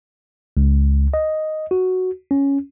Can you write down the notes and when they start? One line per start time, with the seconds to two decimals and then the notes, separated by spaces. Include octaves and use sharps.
0.57 C#2
1.14 D#5
1.71 F#4
2.31 C#4